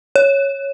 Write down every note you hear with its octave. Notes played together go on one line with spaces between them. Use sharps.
C#5